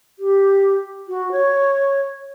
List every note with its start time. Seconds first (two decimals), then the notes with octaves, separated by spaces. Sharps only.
0.19 G4
1.09 F#4
1.32 C#5